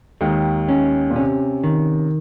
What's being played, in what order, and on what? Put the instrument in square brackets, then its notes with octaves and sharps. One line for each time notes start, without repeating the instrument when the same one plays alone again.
[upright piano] D#2 D#3 [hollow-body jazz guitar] G#3
[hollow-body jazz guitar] C#4
[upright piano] A#2
[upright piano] C3 [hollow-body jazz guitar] C#4
[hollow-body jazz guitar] D#3